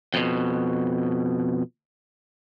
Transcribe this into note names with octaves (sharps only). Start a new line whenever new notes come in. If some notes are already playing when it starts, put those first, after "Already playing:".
F2 B2